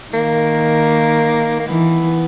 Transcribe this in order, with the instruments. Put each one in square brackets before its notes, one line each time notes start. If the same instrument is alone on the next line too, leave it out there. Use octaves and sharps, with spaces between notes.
[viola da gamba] D#3 [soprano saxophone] A#3
[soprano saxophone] A#3
[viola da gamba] E3 [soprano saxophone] B3